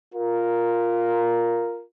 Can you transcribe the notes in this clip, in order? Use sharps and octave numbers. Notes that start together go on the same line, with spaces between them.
F4 A#4